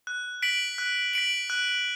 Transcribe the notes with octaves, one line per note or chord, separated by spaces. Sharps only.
F#6
B6 D7 F#7
F#6
B6 D7 F#7
F#6